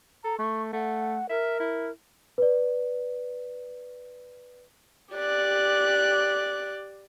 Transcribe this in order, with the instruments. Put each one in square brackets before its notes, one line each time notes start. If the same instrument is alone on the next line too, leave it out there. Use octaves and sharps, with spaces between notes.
[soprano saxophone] A4 [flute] A#5
[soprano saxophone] A3 [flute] C#6
[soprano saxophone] A3 [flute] F#5
[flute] A#4 [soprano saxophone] E5
[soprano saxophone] E4
[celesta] B4 D5
[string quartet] G4 D5 F#6